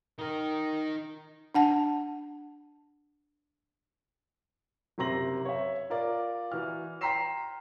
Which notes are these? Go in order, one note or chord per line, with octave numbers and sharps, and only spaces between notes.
D#3 D#4 A#4
D4 F#5 A5
F#1 C3 A#5 C6 A#6 F#7
C#5 E5
F4 A#4 D5
E3 F#4 F6
G5 A#5 C6 B6 C7 E7